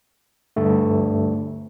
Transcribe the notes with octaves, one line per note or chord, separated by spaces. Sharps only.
G2 D3 A3